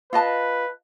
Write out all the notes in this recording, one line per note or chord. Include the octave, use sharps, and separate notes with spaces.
F4 B4 D#5 A5